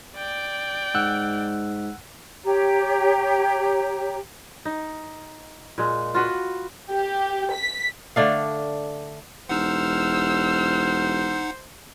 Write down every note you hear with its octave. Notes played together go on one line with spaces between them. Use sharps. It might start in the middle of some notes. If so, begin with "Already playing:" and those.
D5 G5
G#2 F#5 E6 F#6
G4 C#5 A#5
D#4
A#2 G#3
F4 F#4 B4 F#5
G4
B6
D3 A3 D4 F5
E1 D#4 C5 F#5 E6 F6